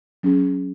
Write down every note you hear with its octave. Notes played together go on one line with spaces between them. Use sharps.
F#3 C#4 G#4